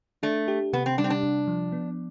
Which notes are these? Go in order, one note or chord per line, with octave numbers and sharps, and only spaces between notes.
A3 D4
G4
C3 B3
C4
G3 D4
C4
D4
C3
F3
B3